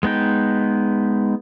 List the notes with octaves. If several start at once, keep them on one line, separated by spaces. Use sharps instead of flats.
G#3 B3 D#4 G5